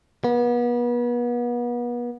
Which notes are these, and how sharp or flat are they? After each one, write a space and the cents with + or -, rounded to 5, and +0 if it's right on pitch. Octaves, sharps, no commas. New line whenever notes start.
B3 -35